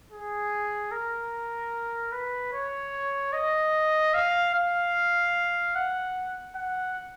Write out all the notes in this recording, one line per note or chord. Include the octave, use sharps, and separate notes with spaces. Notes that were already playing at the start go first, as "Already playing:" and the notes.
G#4
A#4
B4
C#5
D#5
F5
F5
F#5
F#5